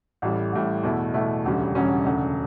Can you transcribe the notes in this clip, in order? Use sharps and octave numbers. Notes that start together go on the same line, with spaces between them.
A1 A2 G3
A1 A2 G3
E2 B2 A3 E4
E2 B2 A3 E4
E1 D2 C#3 G3 C#4
E1 D2 C#3 G3 C#4
E1 D2 C#3